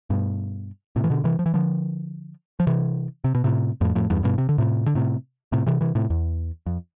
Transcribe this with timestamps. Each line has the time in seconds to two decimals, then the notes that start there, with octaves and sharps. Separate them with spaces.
0.10 G2 B2
0.96 A2 C3
1.04 E3
1.10 B2 D3
1.24 C3 E3
1.39 F3
1.46 E3
1.54 D3 F3
2.60 F3
2.67 C3 E3
3.24 C3
3.35 B2
3.44 A2 C3
3.81 F2 A2
3.95 F2 A2
4.10 E2 G2
4.24 G2 B2
4.38 C3
4.49 D3
4.58 A2 C3
4.87 D3
4.95 A2 C3
5.52 A2 C3
5.67 C3 E3
5.81 C3 E3
5.95 A2 C3
6.10 E2
6.66 F2